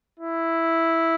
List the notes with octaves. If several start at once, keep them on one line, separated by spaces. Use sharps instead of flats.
E4